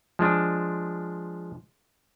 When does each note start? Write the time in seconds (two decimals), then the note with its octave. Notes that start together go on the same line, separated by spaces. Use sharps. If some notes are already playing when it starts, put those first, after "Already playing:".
0.19 F3 G#3 D4